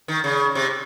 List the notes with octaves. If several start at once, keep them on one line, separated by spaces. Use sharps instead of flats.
D#3
C#3
C3